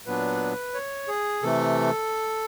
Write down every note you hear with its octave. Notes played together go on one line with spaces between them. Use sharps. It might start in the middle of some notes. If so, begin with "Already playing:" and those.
A#2 F#3 B3 D4 B4
C#5
G#4
C3 E3 A3 A4